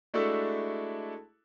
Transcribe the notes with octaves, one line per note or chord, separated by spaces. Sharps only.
G#3 A3 D4 E4 F#4 A4